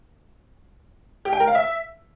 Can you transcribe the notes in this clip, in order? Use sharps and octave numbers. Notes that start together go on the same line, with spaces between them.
G4
G5
A#4
F5
E5